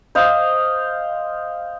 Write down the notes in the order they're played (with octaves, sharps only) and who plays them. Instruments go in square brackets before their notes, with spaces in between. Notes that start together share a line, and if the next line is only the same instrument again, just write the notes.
[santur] C5 D#5 F5